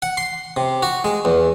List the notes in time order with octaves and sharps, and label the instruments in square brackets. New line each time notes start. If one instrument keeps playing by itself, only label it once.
[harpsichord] F#5
C6
C3
F#4
G#3
E2